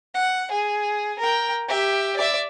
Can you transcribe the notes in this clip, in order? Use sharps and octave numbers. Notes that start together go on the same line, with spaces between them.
F#5
G#4
A#4 G5
G4 E5
D5 E5